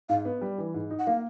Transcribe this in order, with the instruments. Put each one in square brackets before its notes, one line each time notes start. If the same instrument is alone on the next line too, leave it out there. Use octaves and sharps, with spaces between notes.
[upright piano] G#2 [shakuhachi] F5
[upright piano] B3
G3
E3
G#2
D#4
[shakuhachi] F#5
[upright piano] A#3 [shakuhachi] F5